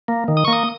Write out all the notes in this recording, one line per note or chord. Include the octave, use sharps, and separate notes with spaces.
A#3
D#3
D#6
A#3 C#6
D#6